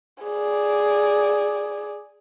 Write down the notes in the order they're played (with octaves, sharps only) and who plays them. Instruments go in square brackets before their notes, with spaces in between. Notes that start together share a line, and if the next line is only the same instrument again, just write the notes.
[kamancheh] G#4 D5